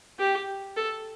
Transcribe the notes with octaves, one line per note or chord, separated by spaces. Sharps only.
G4
A4